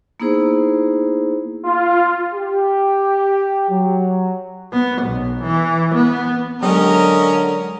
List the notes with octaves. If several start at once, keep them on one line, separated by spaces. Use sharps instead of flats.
A#3 B3 D#4 E4 G#4 C5
F4
G4
F#3
B3
B1
E3
B3
D3 F#3 G#3 C#4 A#4 D#5